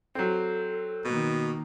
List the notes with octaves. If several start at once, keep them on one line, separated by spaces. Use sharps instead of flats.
F#3 C4 A4
B2 D#3 A#3